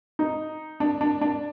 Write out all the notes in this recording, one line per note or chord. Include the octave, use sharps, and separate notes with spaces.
D#4
D4
D4
D4